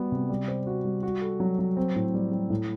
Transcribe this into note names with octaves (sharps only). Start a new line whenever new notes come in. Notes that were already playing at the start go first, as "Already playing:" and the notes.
Already playing: G3 B3 F#4
C3
G3
C5
F#4
G3
F#4
A4
F#3
F#3
C4
A2
G3
G3
A2